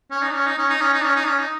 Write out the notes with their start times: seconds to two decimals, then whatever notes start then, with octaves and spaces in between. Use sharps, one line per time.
0.11 C#4
0.23 D#4
0.34 C#4
0.47 D#4
0.58 C#4
0.70 D#4
0.81 C#4
0.93 D#4
1.04 C#4
1.16 D#4
1.27 C#4
1.39 D#4